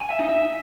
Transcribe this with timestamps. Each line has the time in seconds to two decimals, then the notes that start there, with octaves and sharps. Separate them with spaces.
0.01 G#5
0.10 E5
0.19 D#4
0.28 E5